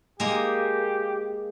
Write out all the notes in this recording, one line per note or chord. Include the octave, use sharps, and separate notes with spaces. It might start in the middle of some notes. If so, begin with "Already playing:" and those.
G#3 A#3 G4